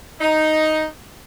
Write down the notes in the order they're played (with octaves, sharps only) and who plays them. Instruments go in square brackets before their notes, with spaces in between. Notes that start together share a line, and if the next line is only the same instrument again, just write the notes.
[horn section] D#4